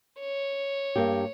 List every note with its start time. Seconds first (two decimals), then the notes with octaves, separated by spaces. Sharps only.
0.20 C#5
0.96 G2 A#3 G4